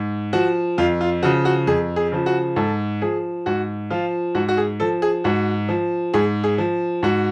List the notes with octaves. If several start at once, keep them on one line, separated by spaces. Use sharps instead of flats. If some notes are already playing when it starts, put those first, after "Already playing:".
Already playing: G#2
F3 F#4
F2 F4
F4
C#3 F3 F#4
F#4
F2 G#4
G#4
C#3 F3
F#4
G#2 A4
F3 G#4
G#2 F#4
F3 F4
G#2 F#4
F#4
G#4
F3 A4
G#4
G#2 F#4
F3
G#2 G#4
G#4
F3
G#2 F#4